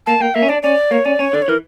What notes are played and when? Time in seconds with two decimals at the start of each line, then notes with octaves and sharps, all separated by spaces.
0.06 A#3 A5
0.20 A#3 G5
0.35 A#3 E5
0.42 C#4
0.49 D4 D5
0.63 C#4 D5
0.91 A#3 C#5
1.05 C#4 D5
1.19 C#4 C#5
1.33 D3 D5
1.42 C#5
1.48 E3 A#4